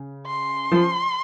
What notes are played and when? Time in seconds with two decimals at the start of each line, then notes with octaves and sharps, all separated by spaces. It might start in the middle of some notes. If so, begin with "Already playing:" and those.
Already playing: C#3
0.27 C6
0.72 F3